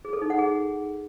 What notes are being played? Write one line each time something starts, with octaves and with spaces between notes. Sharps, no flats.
G#4
A4
D#4
F#5
G#4